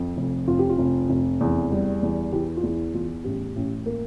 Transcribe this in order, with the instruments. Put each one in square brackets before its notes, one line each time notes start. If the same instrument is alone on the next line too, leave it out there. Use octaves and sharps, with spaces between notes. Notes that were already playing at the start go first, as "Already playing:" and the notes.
Already playing: [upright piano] F2
F1
F1 F4
G4
F4
F1
F1
E2
G3
E2
E3 G4
F4
E2 E4
E2 F4
A1 G4
A1
A#3